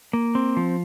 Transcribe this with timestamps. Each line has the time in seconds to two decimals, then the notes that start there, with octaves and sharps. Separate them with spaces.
0.13 A#3
0.35 C4
0.57 F3